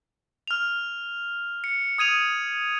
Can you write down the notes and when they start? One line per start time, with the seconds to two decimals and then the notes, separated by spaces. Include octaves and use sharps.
0.48 F6 F7
1.64 C#7
1.98 D#6 G#6 D#7 F7